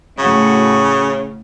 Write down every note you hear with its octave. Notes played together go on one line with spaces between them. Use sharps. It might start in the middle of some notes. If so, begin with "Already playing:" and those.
A2 C#3 F#4